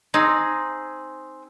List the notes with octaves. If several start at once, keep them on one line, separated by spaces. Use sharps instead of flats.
C4 D#4 G#4